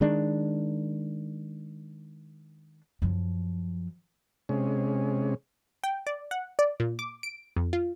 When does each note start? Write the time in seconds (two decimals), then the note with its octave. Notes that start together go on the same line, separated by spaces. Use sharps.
0.01 D#3 G#3 D4
3.02 F#2 F3
4.49 C3 G#3 C#4
5.84 G5
6.07 D5
6.31 F#5
6.59 D5
6.80 A#2
6.99 D6
7.23 D7
7.57 F2
7.73 F4